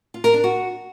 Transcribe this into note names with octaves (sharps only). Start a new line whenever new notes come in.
F4
A#4
D4
F#4